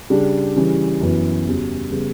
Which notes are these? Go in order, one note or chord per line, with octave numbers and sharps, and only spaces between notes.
C#3 G3 D4 G4
C#3 E3 G3 C#4
F#2 E3 B3 F#4
E2 C#3 G3 C#4 F#4
C#3 G3 B3